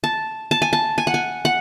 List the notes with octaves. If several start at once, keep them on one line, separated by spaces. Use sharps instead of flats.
A5
A5
G#5
A5
G#5
F#5
G#5
F#5